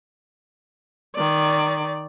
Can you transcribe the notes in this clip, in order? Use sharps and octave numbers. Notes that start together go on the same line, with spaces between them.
D#3 D5